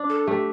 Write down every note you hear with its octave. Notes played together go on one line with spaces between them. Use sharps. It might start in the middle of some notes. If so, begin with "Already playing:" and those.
Already playing: D4
A4
A3 G4